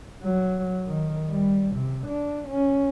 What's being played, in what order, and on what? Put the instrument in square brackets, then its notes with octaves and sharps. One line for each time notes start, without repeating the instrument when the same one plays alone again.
[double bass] F#3
D#3
G3
C3
D4
C#4